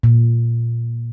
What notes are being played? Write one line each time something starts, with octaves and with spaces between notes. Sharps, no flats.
A#2